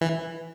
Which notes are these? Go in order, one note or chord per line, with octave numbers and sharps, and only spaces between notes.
E3